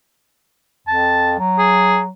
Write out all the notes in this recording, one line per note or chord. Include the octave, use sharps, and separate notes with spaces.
F2 A5
F#3
G#4